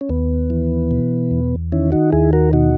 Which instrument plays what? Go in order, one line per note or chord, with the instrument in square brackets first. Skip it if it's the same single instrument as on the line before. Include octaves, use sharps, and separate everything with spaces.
[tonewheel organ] C#4
D#2 B3
E3
B2
E2
D#3 C#4 E4
D#4 F#4
D#2 E4 G#4
F#4 A#4
B2 D#4 F#4